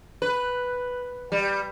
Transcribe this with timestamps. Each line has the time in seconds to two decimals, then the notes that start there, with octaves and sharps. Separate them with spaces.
0.22 B4
1.32 G3